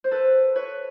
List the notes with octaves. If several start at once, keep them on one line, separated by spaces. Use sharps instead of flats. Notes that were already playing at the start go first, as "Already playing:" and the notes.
C5
A4 B4
B4 C#5